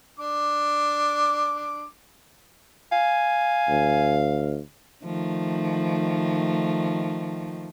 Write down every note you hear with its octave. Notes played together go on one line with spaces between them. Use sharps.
D4 D6
F5 G#5
D2
D#3 F3 A3